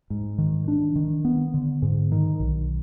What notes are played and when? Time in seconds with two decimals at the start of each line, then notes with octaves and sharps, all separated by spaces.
0.10 G#2
0.38 D#3
0.68 D4
0.96 D#3
1.25 B3
1.54 D3
1.82 G#2
2.12 D#3
2.40 B1